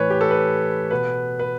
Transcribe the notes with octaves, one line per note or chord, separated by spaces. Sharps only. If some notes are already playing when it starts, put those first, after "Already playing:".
Already playing: A2 E3 B4 C#5
G4
A4
B4
B2 B4
B4